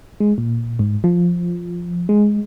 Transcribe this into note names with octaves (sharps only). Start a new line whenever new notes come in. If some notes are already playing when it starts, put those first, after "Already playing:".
G#3
A#2
G#2
F3
G#3